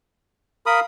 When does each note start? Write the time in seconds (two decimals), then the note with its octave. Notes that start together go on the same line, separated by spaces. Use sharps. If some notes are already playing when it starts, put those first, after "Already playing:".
0.66 A#4 F5 B5 D#6